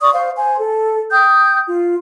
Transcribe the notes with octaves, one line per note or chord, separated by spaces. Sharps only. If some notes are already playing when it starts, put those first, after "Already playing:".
D5 C#6 D#6
C5 F5
C5 G#5
A4
G5 D#6 G6
F4